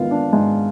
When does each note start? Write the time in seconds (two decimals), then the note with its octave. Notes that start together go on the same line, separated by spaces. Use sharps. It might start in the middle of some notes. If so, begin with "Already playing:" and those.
Already playing: G#2 D#3 B3 F4 F5
0.11 D4
0.33 G#2